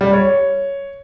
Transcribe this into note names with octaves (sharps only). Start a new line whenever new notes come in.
G3
C#5